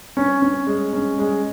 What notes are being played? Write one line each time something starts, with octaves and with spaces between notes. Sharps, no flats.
C#4
C#4
G#3
C#4
G#3